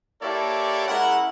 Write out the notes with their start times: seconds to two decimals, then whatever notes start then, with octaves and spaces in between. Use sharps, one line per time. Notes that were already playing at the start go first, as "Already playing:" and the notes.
0.22 A#3 E4 G4 A4 C#5 D5
0.88 G#3 C#4 E4 A#4 F#5